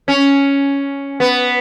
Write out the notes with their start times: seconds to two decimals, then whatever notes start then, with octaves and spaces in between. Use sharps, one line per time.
0.08 C#4
1.20 B3